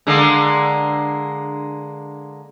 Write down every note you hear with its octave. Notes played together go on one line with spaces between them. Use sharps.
D3 G#3 A#3